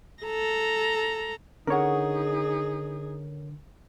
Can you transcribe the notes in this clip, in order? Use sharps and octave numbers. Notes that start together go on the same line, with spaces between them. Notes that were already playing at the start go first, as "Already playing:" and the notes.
A4 A#5
D3 C#4 D#4 G#4 A#4 C#5 F#5